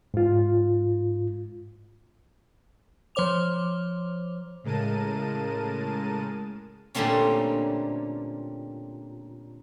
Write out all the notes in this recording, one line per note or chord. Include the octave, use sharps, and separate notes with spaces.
G#2 F4
F3 C5 C#5 D6 F7
A2 C#3 G#3 A#4 A5 D#7
A#2 D3 G3 A3 C4 C#4